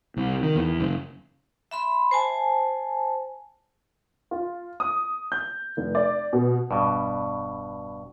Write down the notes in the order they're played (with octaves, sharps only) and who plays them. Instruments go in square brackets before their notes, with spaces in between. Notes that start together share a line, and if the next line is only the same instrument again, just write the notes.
[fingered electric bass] C2
D#3
E2
F#1
[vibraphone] E5 B5 C6
C5 G#5 A5
[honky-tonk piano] F4
D#6
G6
F1
D5
B2
[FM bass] E1 [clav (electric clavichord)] G2 B2